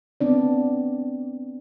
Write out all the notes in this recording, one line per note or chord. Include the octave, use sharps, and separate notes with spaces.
B3 C4 D4 D5